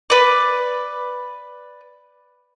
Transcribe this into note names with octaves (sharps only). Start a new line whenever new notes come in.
B4 D5